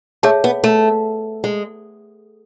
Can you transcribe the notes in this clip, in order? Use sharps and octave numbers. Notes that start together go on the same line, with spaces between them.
A3 G#4 C#5 E5 A5
B3
A3
G#3